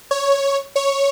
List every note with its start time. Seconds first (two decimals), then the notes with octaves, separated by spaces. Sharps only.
0.11 C#5
0.76 C#5